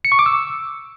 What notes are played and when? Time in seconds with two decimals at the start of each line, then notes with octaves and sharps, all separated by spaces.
0.05 C#7
0.12 C#6
0.19 D6
0.26 E6